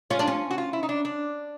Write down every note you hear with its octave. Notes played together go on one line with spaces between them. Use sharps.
C#4 F4
D4
C#4
F#4
F4
E4
D#4
D4
D4